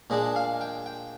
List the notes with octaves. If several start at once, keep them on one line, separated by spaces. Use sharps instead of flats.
A#2 G#3 D4 D#5
F5
G5
G5